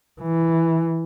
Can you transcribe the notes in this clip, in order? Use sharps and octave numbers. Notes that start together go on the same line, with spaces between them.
E3